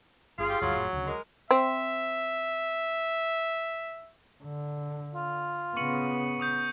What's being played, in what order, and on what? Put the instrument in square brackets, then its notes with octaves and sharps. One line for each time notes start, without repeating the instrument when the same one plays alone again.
[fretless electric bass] G1 [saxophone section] F4 G#4
[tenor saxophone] G4
[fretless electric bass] D2 G2 [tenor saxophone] F#3
[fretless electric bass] F1 A2
D2 C#3
[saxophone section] G#3 A#4
[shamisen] C4 [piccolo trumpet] E5
[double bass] D3
[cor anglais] F4
[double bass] C#3 B3 [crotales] C#6 C#7 F#7
[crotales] C#6 D#6 G6